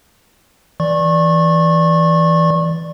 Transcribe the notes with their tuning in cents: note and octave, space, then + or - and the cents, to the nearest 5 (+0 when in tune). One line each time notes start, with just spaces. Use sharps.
E3 +0 D5 +0 C#6 -30